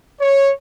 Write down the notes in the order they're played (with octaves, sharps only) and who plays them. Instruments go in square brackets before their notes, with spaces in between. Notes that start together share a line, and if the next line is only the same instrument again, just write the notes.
[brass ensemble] C#5